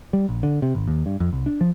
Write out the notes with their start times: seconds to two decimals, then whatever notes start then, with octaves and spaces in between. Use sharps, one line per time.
0.13 G3
0.29 A#1
0.43 D3
0.62 C3
0.75 G#1
0.87 D#2
1.06 G2
1.20 F2
1.33 C2
1.46 D4
1.61 F3